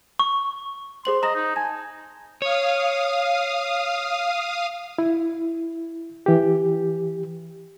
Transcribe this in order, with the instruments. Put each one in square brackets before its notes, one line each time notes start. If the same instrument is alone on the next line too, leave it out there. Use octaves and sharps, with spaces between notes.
[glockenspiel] C#6
[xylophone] G#4 C5 F#7 [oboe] C6
[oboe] D#5 [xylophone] A#5 A#6
[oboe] D#4
[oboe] G#5 [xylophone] A5
[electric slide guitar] C#5 [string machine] F5 D#6
[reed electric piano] E4
E3 G4